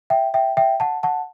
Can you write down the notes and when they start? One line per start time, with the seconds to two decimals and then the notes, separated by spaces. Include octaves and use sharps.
0.10 E5 G5
0.34 E5 G5
0.57 E5 G5
0.80 F#5 A5
1.03 F#5 A5